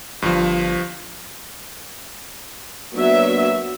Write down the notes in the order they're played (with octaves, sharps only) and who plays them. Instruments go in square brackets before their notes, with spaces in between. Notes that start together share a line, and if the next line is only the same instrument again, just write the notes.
[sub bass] G1 [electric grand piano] G2 F3
[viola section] F#3 E5 [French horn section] A#3 B3 D4